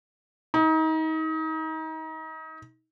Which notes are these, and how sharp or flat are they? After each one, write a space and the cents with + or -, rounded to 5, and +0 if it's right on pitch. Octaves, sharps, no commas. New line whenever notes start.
D#4 +30